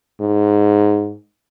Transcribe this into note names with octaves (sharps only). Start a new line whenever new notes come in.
G#2